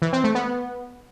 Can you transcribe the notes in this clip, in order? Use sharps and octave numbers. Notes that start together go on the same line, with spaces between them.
E3
C4
A3
B3